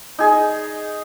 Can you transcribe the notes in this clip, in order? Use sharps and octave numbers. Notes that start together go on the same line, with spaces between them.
D#4 G#4